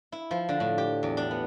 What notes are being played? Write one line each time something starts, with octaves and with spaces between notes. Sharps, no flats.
E4
F3
D3
A2
G4
E2
D4
B3